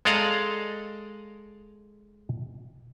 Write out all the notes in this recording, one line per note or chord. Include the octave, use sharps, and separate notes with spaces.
G#3 A4 D5 D#5 F5 A#5